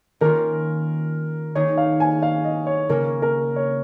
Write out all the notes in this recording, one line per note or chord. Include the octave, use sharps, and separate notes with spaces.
D#3 A#3 C#4 F4 A#4
D#3 A#3 D#4 G#4 C#5
F5
G#5
F5
D#5
C#5
C#3 A#3 C#4 A#4
A#4
C#5